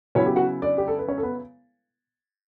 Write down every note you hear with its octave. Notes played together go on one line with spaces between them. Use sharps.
C#3 F#3 B3 C#4 E4 C#5
G4
F#4 F#5
D4 D5
G4
A4
B4
C#4 C#5
A4
B3 B4